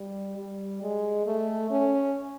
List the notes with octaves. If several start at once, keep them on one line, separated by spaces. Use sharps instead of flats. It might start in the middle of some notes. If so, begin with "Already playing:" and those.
Already playing: G3
G3
G#3
A3
C#4